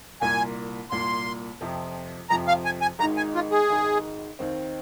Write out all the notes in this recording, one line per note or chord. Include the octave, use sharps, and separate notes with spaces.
C2 A#2 A#3 G#5
C2 A#2 A#3 C6
F2 C3 F3
F2 C3 F3 A#5
F5
G#5
G#5
G#1 G#2 D#3 G#3 D#4 A#5
G#5
F4
G#4
G#1 G#2 D#3 G#3 D#4
D#2 D#3 C4